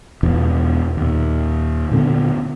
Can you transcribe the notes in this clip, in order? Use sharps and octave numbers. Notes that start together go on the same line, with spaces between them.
E1 E2 B2 F3
D#2 A#2
A#2 D3 B3 D4